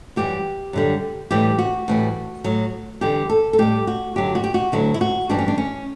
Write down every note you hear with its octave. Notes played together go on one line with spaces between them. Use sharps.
F#2 E3 G3 G4
F#2 D3 G3
A2 E3 G3 G4
F#4
A2 E3 G3
A2 F#3
E2 D3 G3 G4
A4
A4
A2 G3 G4
F#4
F#2 D3 F#3 G4
F#4
G4
F#4
D2 D3 F#3 E4
E4
F#4
G2 E3 G3 D4
C#4
D4
C#4